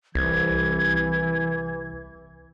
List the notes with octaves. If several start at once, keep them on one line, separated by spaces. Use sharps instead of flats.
C2 E3 G#6